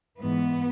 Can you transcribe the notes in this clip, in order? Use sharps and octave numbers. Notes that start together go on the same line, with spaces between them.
G#2 E3 B3